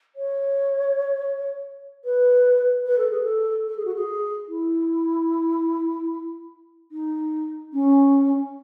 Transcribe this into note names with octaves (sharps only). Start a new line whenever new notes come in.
C#5
B4
B4
A4
G#4
A4
A4
G#4
F#4
G#4
E4
D#4
C#4